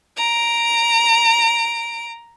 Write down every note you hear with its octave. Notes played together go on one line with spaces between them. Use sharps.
A#5 D7